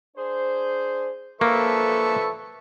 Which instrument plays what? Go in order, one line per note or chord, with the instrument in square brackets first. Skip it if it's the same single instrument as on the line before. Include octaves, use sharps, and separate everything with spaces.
[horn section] D4 G#4 C5
[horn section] D3 F3 A4 [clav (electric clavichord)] A#3 [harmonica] B4 E5 C#6